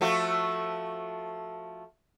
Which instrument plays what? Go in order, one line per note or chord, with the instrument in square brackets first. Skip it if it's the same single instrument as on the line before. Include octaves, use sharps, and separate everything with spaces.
[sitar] F3 A3 F#4